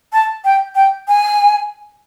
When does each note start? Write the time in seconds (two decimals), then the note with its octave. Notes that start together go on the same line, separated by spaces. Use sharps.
0.13 A5
0.45 G5
0.75 G5
1.08 G#5